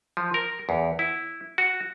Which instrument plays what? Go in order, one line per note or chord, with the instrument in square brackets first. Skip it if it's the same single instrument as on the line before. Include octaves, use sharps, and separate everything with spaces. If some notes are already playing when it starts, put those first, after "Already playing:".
[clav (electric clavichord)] F3
A#4
E2
E4
F#4